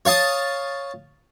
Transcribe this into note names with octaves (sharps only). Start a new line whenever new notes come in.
C#5 F5 A5 D#6